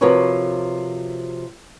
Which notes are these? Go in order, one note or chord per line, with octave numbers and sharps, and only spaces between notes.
C3 F3 F#4 A#4 B4 C#5